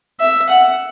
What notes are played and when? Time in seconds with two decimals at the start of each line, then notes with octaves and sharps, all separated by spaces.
0.20 E5
0.49 F#5